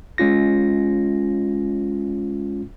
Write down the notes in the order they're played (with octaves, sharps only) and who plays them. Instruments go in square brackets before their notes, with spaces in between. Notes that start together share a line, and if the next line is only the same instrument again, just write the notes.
[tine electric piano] G#3 C#4 F4 A#6